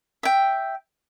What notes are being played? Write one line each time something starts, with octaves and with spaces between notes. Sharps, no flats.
E5 G5